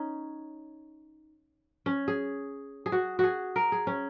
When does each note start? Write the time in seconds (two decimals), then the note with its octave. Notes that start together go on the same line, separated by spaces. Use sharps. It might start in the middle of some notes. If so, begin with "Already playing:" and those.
Already playing: C#4 D#4
1.86 C#4
2.08 G#4
2.86 G#4
2.92 F#4
3.19 F#4 G#4
3.56 A#4
3.72 G#4
3.87 C#4